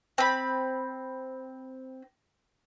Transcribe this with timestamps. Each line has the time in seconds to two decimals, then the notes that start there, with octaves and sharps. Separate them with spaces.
0.18 C4 B5